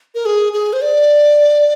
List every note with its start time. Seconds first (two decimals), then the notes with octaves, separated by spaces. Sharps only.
0.15 A#4
0.26 G#4
0.53 G#4
0.73 C5
0.82 D5